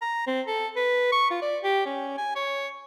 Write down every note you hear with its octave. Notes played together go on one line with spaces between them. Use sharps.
A#5
C4
A4
B4
C#6
F4
D5
G4
C#4
G#5
C#5